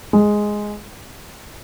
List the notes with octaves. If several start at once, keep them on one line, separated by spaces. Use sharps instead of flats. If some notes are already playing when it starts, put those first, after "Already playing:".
G#3